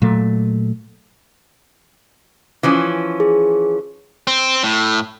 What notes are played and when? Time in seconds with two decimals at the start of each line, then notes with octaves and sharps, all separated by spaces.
0.02 A#2 F#3 A3
2.63 E3 F3 C#4
3.20 G#4
4.27 C4
4.64 A2